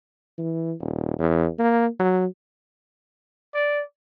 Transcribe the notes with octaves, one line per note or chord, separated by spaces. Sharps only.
E3
D#1
E2
A#3
F#3
D5